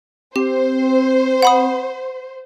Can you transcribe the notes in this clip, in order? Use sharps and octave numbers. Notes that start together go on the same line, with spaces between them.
C4 G4 C5
F#5 B5 D#6